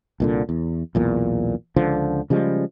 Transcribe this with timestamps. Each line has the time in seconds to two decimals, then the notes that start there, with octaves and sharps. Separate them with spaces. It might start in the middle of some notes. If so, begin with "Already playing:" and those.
0.20 C2 A#2 D3
0.49 E2
0.95 B1 E2 A#2
1.76 C#2 D3 F3
2.30 C#3 F3 G3 G#3